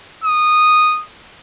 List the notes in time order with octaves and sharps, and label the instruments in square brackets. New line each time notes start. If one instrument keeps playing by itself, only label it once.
[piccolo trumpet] D#6